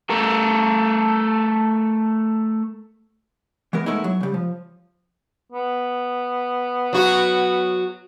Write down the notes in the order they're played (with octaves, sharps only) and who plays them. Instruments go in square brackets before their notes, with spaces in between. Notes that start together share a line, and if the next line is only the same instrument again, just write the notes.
[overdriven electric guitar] A3 A#4
[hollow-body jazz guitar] E3 G#3 B3 A#4
G#3 A3 B3 D#4 E4
F#3
C#3 G3
F3
[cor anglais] B3
[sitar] F#3 F#4